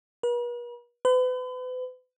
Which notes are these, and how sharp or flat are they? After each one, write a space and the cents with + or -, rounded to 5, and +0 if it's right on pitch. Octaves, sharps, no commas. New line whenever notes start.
B4 -45
B4 +40